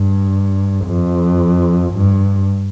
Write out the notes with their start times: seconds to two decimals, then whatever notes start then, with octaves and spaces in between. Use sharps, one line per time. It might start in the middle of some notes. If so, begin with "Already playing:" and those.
Already playing: G2
0.86 F2
1.93 G2